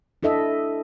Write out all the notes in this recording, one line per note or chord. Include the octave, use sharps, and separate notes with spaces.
D4 E4 A4 D#5 E5